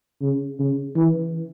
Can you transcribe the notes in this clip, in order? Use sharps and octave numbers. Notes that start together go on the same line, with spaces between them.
C#3
C#3
E3